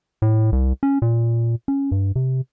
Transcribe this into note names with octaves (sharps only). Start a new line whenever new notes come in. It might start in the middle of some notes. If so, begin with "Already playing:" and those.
A2
C2
C#4
A#2
C#4
G2
C3